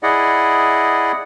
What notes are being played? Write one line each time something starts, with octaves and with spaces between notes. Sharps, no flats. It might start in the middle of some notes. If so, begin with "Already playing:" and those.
E4 G#4 D5 D#5 F#5